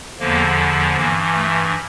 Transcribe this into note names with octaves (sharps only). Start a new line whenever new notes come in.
E2 D3 F3 A#3
G2 E3 A#3
A3